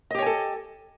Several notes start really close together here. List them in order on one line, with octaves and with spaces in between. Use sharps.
D#5 G4 C#5 G#5 A4